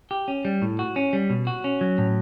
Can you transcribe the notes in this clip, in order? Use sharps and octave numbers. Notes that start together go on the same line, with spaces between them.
G4
C#4
G3
A2
F#4
C#4
G3
B2
F#4
C#4
F#3
A2